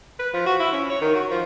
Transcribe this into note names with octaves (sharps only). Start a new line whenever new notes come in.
B4
F3
F#4
E4
C#4
C#5
D#3
F#4
F3